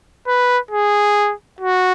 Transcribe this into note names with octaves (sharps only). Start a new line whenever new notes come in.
B4
G#4
F#4